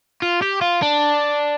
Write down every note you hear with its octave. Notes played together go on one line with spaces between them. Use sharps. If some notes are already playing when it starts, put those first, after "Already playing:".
F4
G4
F4
D4